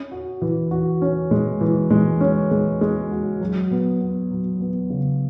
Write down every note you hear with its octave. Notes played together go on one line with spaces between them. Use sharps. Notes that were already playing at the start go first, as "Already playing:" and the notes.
Already playing: C#4
F#4
E3
F#4
C#4
G#3
E3
G#3
C#4
G#3
G#3
F#4
F#3
B3
B3
F#3
B3
C#3